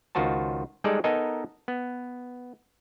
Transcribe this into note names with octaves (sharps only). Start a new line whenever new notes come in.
C#2 D#3 F4 F#4 C5 A5
G3 G#3 D#4 G#4 A4 D5
B3 D#4 A4 A#4 D#5 G#5
B3